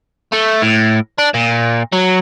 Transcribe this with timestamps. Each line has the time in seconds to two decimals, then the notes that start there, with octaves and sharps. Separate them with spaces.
0.33 A3
0.62 A2
1.18 D4
1.34 A#2
1.93 F#3